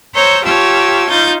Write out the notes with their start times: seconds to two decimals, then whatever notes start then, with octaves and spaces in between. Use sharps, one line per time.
0.14 C5 C#5 A#5 E6 G6
0.44 F4 G4 C#5 A5 E6
1.09 D#4 F4 G6 A6